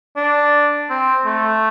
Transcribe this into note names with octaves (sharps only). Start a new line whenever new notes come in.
D4
C4
A3